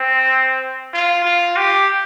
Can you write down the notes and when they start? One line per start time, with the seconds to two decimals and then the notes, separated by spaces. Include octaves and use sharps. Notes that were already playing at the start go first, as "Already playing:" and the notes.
Already playing: C4
0.94 F4
1.25 F4
1.56 G4